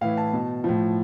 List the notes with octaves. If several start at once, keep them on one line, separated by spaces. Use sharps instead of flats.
A2 E3 F5
A5
B2
A2 F3